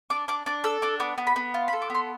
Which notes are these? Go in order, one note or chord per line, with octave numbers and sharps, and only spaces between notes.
D4 D6
D4 D6
D4 D6
A4 E6
D4 D6
B3 D6
B3
B5
B3
F4
B5
A4
D6
B3 C6